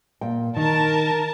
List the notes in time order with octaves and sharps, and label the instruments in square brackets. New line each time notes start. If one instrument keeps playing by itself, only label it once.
[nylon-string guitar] A#2 G5
[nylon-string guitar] D#3 [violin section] A#4 A5